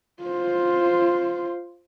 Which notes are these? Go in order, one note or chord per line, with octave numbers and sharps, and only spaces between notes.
F4 C5